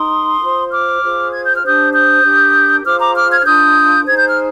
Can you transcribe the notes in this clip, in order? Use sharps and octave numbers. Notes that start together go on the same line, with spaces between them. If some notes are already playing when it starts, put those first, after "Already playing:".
Already playing: D#4 A#4 C6 D#6
F4 C5
D6 F6
F4 G#4 C5
G#6
G6
F6
D4 G4 C5 D#6 G6
D#6 G6
D4 G4 A#4
F4 G#4 C5 D6 F6
A#5 D6
D6 F6
F6 G#6
G#6
D4 F4 A#4 D#6 G6
D#4 G#4 C5 G#6
G6
F6